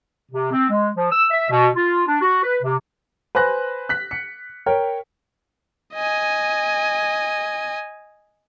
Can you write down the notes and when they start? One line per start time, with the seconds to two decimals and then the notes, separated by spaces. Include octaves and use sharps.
0.32 C3
0.52 C4
0.70 G#3
0.97 F3
1.12 E6
1.31 E5
1.50 B2
1.76 F4
2.07 D4
2.22 F#4
2.43 B4
2.63 C3
3.35 B4 C5 G#5 F#6 A#6
3.89 F#6 B6
4.11 C#7
4.66 A#4 C#5 G5
5.94 D#5 G#5